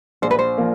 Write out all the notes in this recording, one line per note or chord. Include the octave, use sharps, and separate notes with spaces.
A#1 C5
B4
C5
F3 A#3